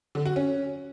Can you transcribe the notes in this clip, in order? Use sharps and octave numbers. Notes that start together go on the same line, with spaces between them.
D3
F#4
C#4